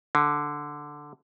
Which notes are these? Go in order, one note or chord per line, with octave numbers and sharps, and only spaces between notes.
D3